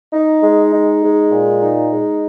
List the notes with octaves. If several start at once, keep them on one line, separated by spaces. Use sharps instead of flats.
D#4
G#3
D#4
G#3
A#2
D#4
G#3